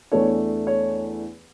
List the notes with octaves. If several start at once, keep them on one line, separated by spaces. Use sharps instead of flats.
E2 E3 A3 D4 C#5
C#5